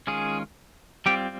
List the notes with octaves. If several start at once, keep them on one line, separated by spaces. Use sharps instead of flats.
D#3 G#3 C#4 F4 G#4
G3 C4 F4 G4